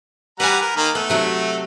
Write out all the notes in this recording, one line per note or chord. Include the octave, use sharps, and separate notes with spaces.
G3 B4 F#5 G#5 A#5
A#4
D#3 A#3 A#4
A3 B3
C3 F#3 F#4